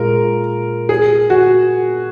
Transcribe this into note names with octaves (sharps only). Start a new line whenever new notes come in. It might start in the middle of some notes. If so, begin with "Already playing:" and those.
Already playing: A#2 G#3 A#4
G#4
F#4